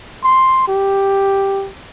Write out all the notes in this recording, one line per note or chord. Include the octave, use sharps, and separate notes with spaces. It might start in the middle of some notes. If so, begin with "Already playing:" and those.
C6
G4